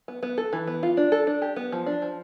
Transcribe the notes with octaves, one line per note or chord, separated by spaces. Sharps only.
B3
B3
A4
E3
B3
F4
D4
A4
D4
G4
B3
F3
D4
F3